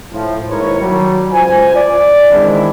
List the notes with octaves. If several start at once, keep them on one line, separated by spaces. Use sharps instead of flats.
A2 F3
D#2 G#2 E4 A#4 B4 C#5
D#3 F#3 G3
C#2 F4 C5 G#5
D5
D#3 E3 G#3 C4 D4 E4